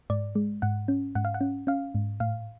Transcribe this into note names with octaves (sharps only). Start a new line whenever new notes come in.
G#2 D5
G#3
G#2 F#5
C#4
G#2 F#5
F5
F#5
C#4
C#4 F5
G#2
A2 F5